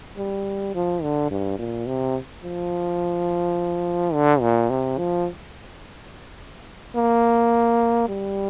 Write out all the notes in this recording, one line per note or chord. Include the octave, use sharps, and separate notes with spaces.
G3
F3
D3
G2
A#2
C3
F3
D3
A#2
C3
F3
A#3
G3